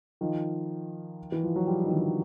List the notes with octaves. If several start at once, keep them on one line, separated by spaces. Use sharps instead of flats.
D#3 F3
E3
F3
F#3
F3 G3
D#3
D3 E3